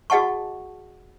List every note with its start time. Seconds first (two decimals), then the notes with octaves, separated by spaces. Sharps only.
0.10 F#4 G#4 D#5 F#5 A5 C#6